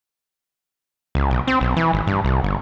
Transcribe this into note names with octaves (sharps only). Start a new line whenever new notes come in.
C#2
B1
C4
B1
E3
G#1
G2
C2
G1